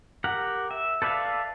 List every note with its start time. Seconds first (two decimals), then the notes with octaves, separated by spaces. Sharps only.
0.24 G4 A#4 F#5
0.71 E5
1.02 A4 B4 D5 E5 F5